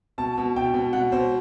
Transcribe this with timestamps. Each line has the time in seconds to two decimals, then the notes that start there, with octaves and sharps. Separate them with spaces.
0.18 B2 A5
0.38 B2
0.56 B2 G5
0.74 B2
0.93 B2 F#5
1.12 B2 C5